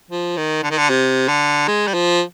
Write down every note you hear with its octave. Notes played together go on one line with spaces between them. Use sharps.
F3
D#3
D3
D#3
D3
C3
D3
G#3
G3
F3